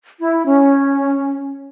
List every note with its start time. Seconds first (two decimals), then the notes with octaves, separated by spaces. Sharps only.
0.19 E4
0.46 C#4